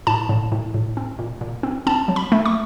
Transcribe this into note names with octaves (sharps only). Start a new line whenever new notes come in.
A2 A5
A2
A2
A2
C4
A#2
A#2
C4
C4 A5
F#3
B5
A3
C#6